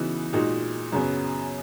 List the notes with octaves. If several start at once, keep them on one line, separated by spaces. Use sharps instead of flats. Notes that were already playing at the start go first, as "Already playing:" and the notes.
Already playing: C#3 E3 B3 D#4 F#4
A#2 G#3 D#4 F#4
F#2 C#3 F#3 B3